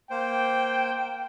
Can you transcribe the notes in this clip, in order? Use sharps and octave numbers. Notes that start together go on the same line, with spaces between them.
A#3 C5 G5